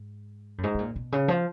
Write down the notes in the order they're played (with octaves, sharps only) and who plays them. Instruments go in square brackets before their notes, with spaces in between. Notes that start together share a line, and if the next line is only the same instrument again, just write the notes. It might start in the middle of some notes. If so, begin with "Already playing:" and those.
Already playing: [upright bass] G#2
F#2
G#2
B2
A#2
B2
C#3
F3